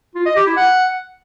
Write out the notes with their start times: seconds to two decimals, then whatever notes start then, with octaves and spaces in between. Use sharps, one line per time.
0.15 F4
0.26 D#5
0.36 G4
0.46 E4
0.57 F#5